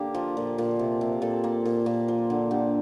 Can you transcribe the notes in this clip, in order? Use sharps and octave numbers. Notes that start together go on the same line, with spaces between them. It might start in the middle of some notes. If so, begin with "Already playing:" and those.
Already playing: D3 A#3 G4 A#4
F3
A#2
A#2
C3
C3
A#2 A4
A#3
A#2
A#2
F3
D3
D3 G4